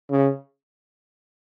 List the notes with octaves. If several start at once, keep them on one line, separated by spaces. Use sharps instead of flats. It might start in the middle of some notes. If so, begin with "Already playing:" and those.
C#3